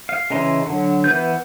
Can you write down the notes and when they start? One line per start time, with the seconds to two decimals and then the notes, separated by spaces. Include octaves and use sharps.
0.09 F5
0.30 C#3 E3 D#5 A#5 C6
0.66 D3 F#3
1.04 E3 B3 B4 G6